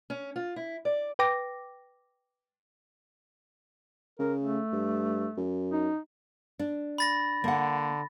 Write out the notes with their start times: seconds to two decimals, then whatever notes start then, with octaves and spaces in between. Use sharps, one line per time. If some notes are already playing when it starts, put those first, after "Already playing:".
0.10 C#4
0.36 F4
0.56 E4
0.85 D5
1.19 B4 G5 D6 A#6
4.19 C#3 A#4
4.39 A3
4.72 G2
5.37 F#2
5.72 D#4
6.59 D4
6.98 B5 A6 A#6
7.44 D3 A#3 F#5